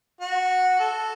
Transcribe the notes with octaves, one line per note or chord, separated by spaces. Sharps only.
F#4
A4